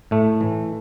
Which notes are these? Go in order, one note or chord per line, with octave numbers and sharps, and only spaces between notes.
A2 A3
E3